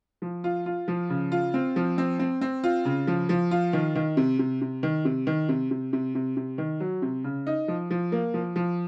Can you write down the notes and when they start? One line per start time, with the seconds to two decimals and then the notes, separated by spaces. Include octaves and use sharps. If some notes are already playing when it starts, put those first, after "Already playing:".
0.22 F3
0.44 F4
0.66 F4
0.88 F3
1.10 C#3
1.32 F4
1.54 C4
1.76 F3
1.98 C4
2.19 C4
2.41 C4
2.64 F4
2.85 C#3
3.07 F3
3.29 F3
3.51 F4
3.73 D#3
3.95 D#3
4.17 C3
4.39 C3
4.61 C3
4.83 D#3
5.05 C3
5.27 D#3
5.49 C3
5.71 C3
5.93 C3
6.15 C3
6.37 C3
6.58 D#3
6.80 F#3
7.02 C3
7.24 C#3
7.47 D#4
7.68 F3
7.91 F3
8.12 A#3
8.34 F3
8.56 F3